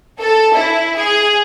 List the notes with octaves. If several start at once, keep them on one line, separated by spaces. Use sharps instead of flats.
A4
E4
G#4